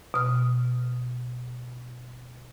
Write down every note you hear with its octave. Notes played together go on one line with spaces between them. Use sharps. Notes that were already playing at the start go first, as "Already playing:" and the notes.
B2 F6